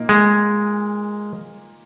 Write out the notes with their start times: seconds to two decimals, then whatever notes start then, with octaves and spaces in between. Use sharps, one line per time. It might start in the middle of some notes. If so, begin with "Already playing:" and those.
Already playing: A#2 A#3 D#4
0.09 G#3